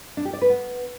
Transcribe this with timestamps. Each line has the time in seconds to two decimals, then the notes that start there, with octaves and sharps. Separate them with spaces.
0.17 D4
0.25 G4
0.33 D5
0.42 B4
0.50 B3